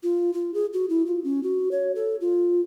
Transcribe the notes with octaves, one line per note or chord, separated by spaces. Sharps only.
F4
F4
G#4
F#4
E4
F4
C#4
F#4
C#5
A4
F4